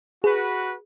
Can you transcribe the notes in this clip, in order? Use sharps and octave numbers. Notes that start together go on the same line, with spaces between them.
F#4 G#4 B4